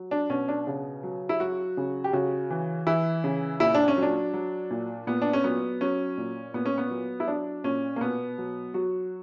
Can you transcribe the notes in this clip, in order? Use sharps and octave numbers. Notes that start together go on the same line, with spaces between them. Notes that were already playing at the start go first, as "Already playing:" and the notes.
Already playing: F#3
D4
B2 C#4
D4
C#3
F#3
E4
F#3 F#4
C#3
G4
C#3 F#4
E3
E3 E4
C#3
A#2 E4
D4
C#4
F#3
D4
F#3
A#2
A#2 B3
D4
C#4
F#3 B3
F#3 C#4
A#2
A#2 B3
C#4
B3
F#3
E4
F#3 D4
A#2 C#4
A#3
B2 B3
F#3
F#3 F#4